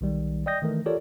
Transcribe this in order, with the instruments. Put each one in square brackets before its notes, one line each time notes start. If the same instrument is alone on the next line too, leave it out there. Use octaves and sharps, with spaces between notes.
[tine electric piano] B1 D#3 G3
D5 D#5 G5 D#6 G6 A#6
D#3 E3 A3 A#4
F4 G4 A4 A#4 C#5 D5